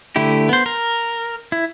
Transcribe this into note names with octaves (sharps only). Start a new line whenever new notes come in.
D3 A3 E4 G4
B3 C5
A#4
E4